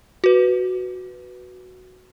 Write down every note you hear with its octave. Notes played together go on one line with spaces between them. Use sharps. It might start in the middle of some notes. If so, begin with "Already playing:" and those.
F#4 B4